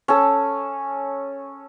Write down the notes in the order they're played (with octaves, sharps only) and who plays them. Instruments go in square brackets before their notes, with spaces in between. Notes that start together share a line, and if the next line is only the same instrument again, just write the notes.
[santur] C#4 A4